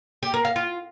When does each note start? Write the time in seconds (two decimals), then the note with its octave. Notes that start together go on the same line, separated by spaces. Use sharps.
0.23 G4
0.34 A#4
0.45 F5
0.56 F4